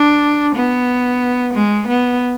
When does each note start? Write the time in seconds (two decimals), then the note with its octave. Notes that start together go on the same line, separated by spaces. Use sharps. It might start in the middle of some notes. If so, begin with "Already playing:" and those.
Already playing: D4
0.56 B3
1.54 G#3
1.88 B3